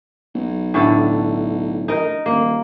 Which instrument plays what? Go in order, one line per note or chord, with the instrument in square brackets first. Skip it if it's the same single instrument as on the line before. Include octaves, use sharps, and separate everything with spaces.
[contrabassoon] B1
[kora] A2 D3 A4
D#4 A#4
[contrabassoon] D#1 [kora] A#3